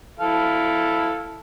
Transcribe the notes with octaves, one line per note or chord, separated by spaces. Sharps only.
E4 A4 F5